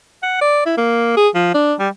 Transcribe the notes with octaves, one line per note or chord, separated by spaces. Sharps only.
F#5
D5
E4
A#3
G#4
F3
D4
G3